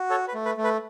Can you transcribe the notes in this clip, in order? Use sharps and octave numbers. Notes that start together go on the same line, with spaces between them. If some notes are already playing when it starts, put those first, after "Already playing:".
Already playing: F#4
A4 C#5
B4
A3
B4
A3
B4